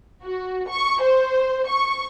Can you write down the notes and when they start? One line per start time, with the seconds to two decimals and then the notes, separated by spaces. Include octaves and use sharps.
0.24 F#4
0.68 C#6
1.02 C5
1.68 C#6